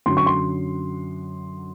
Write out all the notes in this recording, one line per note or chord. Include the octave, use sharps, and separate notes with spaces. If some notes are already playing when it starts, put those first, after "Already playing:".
F#2 D3 F#3 C6
C#6
C6